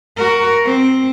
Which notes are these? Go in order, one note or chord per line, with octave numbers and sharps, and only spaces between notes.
F#4 A#4
C4